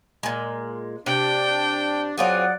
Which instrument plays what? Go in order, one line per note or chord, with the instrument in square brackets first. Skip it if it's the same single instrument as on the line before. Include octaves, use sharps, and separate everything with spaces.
[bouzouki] A#2 G#3
[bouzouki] C3 [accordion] D4 [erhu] G5
[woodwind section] F#3 D5 F#5 [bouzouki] C4 F4 G#4